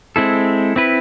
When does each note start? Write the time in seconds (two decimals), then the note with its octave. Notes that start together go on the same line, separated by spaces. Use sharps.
0.16 G#3 C4 E4 A4
0.76 C4 E4 B4